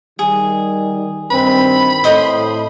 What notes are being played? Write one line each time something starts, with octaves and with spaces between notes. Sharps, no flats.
D#3 G3 G#4
G2 D#3 C4 B5
A2 C5 D#5 C6